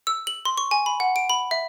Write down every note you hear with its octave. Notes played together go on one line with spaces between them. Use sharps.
E6
F#7
C6
C#6
G#5
B5
F#5
D7
B5
E5